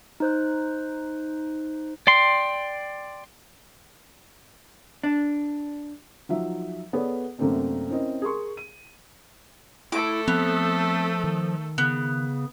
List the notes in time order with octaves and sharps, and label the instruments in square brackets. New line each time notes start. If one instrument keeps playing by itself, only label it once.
[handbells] D#4 C5 F#6
[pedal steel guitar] D5 G5 C6
[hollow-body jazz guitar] D4
[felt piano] F3 F#3 D#4 E5
B3 G#4 A4 B4 C#5 D5
F#2 C3 A3 A#3 C4 D4
C4 C#4 E4 A#4 D#5
G#4 A#4 C6 C#6
D#7
[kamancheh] A3 A4 [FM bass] E4 [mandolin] D6
[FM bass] F3 [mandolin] B3 [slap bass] C4
[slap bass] D#3
[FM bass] C#3 [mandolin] B3